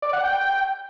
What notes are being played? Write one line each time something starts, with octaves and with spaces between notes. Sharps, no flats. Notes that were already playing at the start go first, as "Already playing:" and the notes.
D5
F#5
G5